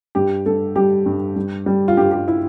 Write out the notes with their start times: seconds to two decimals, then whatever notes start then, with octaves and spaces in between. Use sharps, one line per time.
0.15 G2 G4
0.46 G2 A4
0.76 G3 G4
1.06 G2
1.36 G2
1.66 G3
1.88 F4
1.97 G2 G4
2.11 G4
2.28 E4